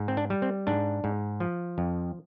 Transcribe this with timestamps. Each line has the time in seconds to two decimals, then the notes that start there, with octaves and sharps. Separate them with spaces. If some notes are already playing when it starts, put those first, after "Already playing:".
Already playing: G#2
0.08 C4
0.17 D4
0.30 G3
0.42 C4
0.67 G#2 D4
1.04 G#2
1.40 F3
1.78 F2